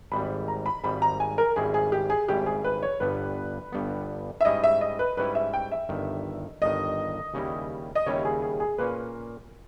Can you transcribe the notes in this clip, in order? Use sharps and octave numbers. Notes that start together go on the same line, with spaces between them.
G#1 G#2 G3 B5
A#5
B5
G#1 G#2 G3 B5
A#5
G#5
A#4
G#1 G#2 G3 C#4 E4 G#4
G#4
G4
G#4
G#1 G#2 G3 C#4 E4 G4
G#4
B4
C#5
G1 G2 G3 B3 B4
G1 G2 G3 B3
E5
G#2 G3 C#4 E4 D#5
E5
D#5
B4
G#2 G3 C#4 E4 B4
E5
G5
E5
G1 G2 D#3
G1 G2 D#3 D#5
D#2 C#3 G3 C#4 E4
D#5
D#2 C#3 G3 C#4 E4 C#5
G#4
G#4
G#4
A#2 A#3 C#4 B4